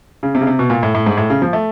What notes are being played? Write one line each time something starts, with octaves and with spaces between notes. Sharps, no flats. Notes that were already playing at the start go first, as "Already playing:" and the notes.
C#3
C3
C#3
C3
B2
A#2
A2
A2
G#2
A2
C#3
F3
A3